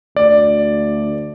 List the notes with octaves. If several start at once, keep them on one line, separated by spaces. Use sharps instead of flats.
D2 D5